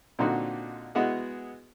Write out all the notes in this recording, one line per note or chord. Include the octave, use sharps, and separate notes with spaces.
A#2 D3 C4 D#4 F#4
G#3 B3 E4 F#4 G#4 D#5